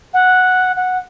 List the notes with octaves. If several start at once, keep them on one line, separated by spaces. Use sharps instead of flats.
F#5
F#5